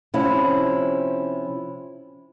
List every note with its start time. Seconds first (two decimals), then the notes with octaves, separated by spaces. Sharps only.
0.14 C3 F3 C#4 E4